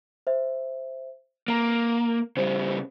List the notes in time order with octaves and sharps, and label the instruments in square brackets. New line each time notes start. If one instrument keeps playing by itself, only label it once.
[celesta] C5 E5
[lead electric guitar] A#3 [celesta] A#5 D7
[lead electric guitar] C#3 G3 [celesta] C5